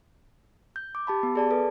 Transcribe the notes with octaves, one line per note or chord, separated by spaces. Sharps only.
G6
D6
G4 A5 B5
B3
G#4 D5 A5
A4 B4